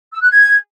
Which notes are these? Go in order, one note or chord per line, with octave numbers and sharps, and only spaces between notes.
E6
F#6
G#6